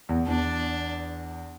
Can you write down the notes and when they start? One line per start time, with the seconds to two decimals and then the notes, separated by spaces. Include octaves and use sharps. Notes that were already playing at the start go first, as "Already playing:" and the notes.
0.09 E2
0.26 E2 D4